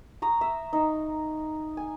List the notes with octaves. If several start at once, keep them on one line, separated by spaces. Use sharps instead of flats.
A#5 C#6 D#6
E5
D#4
G#5